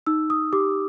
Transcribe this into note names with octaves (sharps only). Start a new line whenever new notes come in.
D#4 E6
D#6
G4 D6